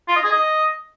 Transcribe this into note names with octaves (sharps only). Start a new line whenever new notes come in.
F4
D#5
G#4
D#5